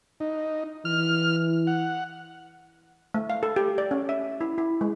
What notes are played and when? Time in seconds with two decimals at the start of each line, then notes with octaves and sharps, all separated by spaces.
0.20 D#4
0.85 E3 F6
1.67 F#5
3.14 A3
3.30 F5
3.43 A4
3.56 G4
3.78 D5
3.91 C#4
4.09 E5
4.41 E4
4.58 E4
4.81 G#3